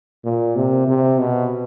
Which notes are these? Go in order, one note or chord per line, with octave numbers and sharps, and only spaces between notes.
A#2
C3
C3
B2